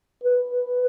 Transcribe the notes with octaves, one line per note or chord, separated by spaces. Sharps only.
B4